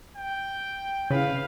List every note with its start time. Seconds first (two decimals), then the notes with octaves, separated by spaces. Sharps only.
0.16 G5
1.10 C#3 E4 B4 F5